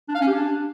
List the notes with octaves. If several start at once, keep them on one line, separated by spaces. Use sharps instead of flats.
D4
F5
C#4
G4
D4